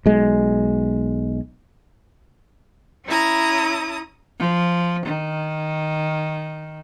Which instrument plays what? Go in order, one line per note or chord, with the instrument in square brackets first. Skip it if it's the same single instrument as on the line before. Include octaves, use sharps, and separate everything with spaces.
[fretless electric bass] B1 G#3
[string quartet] C#4 E4 A#5 D#6
[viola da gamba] F3
D#3